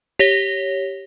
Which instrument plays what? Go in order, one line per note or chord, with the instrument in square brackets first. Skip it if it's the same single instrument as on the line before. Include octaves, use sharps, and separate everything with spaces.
[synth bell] G4 C#5 A#6 G7